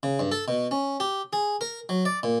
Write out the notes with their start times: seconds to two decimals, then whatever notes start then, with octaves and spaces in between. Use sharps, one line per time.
0.03 C#3
0.19 G2
0.32 A4
0.48 B2
0.71 C#4
1.00 G4
1.33 G#4
1.61 A#4
1.89 F#3
2.05 D5
2.23 A#2